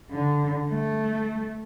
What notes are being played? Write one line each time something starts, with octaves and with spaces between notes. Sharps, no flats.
D3
A3